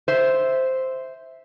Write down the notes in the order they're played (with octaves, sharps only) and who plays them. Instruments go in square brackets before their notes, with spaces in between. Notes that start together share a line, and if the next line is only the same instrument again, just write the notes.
[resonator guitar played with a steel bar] C5 E5